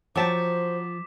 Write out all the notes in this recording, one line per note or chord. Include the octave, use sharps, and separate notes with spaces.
F3 F#3 C5 G5 A5 D6 B6 E7